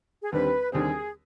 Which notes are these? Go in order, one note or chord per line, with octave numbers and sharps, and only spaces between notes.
G#4
D#2 D3 G3 C4 B4
D#2 D3 G3 C4 G#4